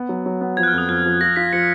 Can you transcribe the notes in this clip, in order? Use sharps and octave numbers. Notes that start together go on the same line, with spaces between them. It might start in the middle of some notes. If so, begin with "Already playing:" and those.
Already playing: B3
F#3
F#3
B3
F3 G#6
F#6
F6
F2 D#6
F2 F#6
F3
F3 A#6
F4 B6
F3 A#6 C#7